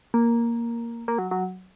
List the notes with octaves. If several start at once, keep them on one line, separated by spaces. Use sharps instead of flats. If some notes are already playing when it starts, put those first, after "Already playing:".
A#3
A#3
F#3
F#3